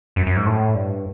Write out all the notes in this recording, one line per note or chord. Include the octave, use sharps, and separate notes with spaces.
F#2
F#2
G#2
A2
G2